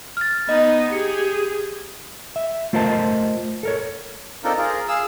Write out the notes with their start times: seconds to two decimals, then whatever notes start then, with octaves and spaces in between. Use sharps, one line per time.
0.17 F6 A6
0.49 B3 D#4 D#5
0.92 G4 G#4 C#7
2.36 E5
2.73 A3 F4 A#4 C5 D#5 A5
3.63 A4 A#4 C#5
4.44 C4 D4 D#4 F4 A4 A#4
4.58 F4 G#4 A#4
4.88 G#4 F5 E6